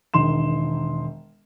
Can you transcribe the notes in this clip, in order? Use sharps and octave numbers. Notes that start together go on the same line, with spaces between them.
E1 D#3 C6 E7